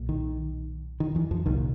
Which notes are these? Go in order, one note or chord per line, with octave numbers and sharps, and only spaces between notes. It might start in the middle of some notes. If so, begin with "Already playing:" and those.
Already playing: B1 A#2
D#3
D#3
E2 E3
F2 F3
C2 A#2 D#3